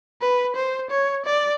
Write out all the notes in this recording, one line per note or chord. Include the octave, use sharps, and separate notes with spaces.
B4
C5
C#5
D5